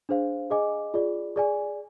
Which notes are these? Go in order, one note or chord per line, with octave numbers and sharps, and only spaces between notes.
D4 G#4 C5 F5
G#4 D#5 G#5 D6
F4 G#4 D5
G#4 D5 G#5